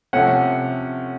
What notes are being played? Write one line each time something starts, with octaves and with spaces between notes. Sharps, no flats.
C3 F3 A3 C#4 F#5